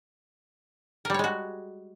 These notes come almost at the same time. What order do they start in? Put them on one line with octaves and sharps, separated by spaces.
A#4 G3 C#5 G#3 F#4